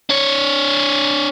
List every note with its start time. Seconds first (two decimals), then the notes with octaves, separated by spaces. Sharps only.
0.10 D4 C#5